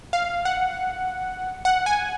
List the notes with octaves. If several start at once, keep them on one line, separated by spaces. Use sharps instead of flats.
F5
F#5
F#5
G#5